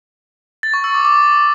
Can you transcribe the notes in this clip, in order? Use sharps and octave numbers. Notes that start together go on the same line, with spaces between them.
A6
C#6
E6
D6
D6